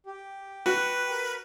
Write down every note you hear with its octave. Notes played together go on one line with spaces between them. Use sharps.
G4
F#4 B4
A#4